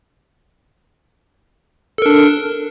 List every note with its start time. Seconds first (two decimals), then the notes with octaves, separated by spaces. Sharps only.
1.98 A4
2.02 A#4
2.06 D4